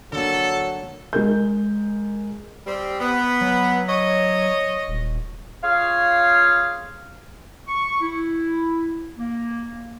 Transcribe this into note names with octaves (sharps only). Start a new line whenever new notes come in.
D3 F#3 A#3 A4
G#3 A#4 G6
G3 C4
B3
F#3
C#5 D#5
D#1
F4 G#4 C#5 F5
C#6
E4
A#3